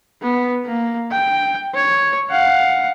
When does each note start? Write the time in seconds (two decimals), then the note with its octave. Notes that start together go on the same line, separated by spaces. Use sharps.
0.22 B3
0.66 A#3
1.12 G5
1.74 C#5
2.30 F5 F#5